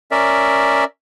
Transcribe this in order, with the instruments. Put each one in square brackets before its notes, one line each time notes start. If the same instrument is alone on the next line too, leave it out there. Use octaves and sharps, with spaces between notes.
[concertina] C#4 A#4 D5 E5